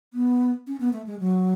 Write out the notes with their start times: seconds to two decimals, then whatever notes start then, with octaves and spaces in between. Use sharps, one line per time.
0.14 B3
0.67 C#4
0.80 B3
0.93 A3
1.06 G#3
1.20 F#3